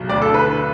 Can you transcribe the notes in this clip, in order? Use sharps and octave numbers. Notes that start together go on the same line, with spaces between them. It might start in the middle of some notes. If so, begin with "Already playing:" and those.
Already playing: B1
D2 D5
A4
D3
B4
D3